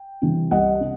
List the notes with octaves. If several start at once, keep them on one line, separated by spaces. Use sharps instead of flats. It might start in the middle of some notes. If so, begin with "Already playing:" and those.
Already playing: G5
C3 E3 G3
C2 D#5 F#5
C3